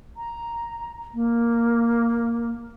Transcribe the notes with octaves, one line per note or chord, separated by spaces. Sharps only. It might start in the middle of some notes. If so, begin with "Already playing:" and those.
A#5
A#3